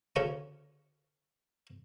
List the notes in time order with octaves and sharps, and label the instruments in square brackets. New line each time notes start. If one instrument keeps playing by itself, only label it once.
[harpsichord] D2 C#3 C#4 D4 A4 C#6